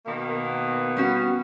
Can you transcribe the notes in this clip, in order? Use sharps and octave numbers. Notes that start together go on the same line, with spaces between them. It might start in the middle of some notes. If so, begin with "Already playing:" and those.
B2 D#3 A#3
B3
G3 C#4 F#4